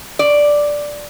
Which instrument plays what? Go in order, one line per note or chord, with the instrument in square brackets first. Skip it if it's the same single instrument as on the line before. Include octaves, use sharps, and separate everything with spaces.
[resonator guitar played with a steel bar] D5